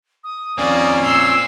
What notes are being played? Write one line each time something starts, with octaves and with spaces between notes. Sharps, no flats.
D#6
F2 D#3 A#3 C#4 D5 G#5
A#2 C6 E6